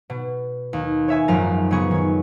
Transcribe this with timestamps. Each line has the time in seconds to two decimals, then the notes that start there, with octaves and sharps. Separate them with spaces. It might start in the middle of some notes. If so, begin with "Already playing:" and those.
0.10 B2
0.73 D#2
1.08 C#5 E5 G#5
1.28 G#1 F#2 F3 A#4 A#5 A6
1.71 A#2 C#3 B3 G#4 C#6
1.91 D#3 C#5